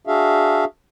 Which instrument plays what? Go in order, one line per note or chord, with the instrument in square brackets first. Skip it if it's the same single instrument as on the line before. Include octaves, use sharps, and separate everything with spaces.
[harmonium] D4 F#4 G#4 E5 F5